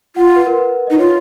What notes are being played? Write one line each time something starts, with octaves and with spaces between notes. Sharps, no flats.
F4 F#5
F#5
B4
A#4
B4
D#4 D#5
F4 C#5